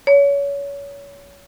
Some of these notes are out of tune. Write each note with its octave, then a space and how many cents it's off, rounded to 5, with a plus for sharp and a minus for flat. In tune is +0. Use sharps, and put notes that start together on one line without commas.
C#5 +30